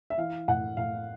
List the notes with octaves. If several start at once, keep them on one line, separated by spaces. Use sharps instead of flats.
E5
E3 F5
A2 F#5
A2 F5